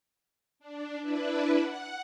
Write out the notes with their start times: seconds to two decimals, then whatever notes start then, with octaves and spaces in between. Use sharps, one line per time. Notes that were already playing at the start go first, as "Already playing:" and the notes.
0.59 D4
1.01 D4 E4 B4
1.56 F#5